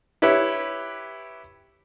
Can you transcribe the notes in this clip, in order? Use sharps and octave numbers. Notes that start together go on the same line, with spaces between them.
E4 G4 B4 C#5 E5